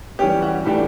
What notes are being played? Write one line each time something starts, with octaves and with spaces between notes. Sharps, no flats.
E3 G3 C#4 G4
F#4
A2 E3 A3 D4 G4